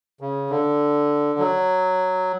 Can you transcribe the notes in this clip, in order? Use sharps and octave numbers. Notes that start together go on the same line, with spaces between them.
C#3
D3
F#3